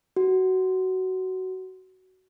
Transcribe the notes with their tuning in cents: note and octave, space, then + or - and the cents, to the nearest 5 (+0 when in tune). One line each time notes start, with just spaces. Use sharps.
F#4 +15